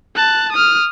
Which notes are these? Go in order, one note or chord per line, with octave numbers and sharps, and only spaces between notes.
A5 F#6
D#6 F6